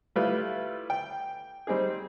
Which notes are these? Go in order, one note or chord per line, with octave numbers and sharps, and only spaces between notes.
G3 A3 E4 F4 B4
G5
G3 C4 D#4 G#4